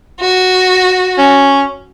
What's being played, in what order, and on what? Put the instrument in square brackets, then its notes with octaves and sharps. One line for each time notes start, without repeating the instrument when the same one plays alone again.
[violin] F#4
[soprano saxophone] C#4